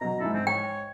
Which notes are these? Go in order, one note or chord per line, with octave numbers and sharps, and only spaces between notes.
B2 F#3 A#5
G#2 D#4 E4 A4
G#2 C4
C#5 G5